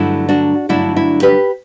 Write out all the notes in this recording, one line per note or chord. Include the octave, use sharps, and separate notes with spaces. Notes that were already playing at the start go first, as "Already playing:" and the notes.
Already playing: G2 D3 F#3 A3 E4
D4 F#4
G2 D3 F#3 A3 D4 E4
E4
G4 B4